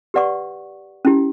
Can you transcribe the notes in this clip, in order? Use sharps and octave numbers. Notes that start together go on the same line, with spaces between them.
G4 B4 D5 F#5 C#6
C#4 E4 G4